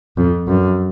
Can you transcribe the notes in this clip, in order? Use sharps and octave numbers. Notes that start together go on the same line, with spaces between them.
F2
F#2